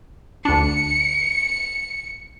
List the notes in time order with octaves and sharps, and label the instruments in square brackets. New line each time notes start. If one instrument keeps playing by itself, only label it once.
[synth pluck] D2 D4 [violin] C#7